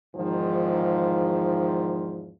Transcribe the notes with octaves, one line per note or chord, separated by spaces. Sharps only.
E2 G#2 D#3 F3